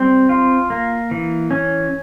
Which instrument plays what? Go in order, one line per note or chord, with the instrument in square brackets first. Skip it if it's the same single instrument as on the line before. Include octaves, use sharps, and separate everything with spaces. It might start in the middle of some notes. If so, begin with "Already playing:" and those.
Already playing: [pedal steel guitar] G3 C4
F4
A#3
E3
C#4